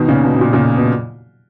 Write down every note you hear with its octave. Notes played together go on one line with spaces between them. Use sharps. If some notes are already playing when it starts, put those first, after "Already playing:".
Already playing: B2 D#3
A#2 C#3
B2
B2
A#2
A#2 C#3
B2